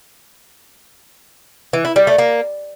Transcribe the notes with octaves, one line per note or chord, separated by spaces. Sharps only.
E3
E4
G3
A3
A#3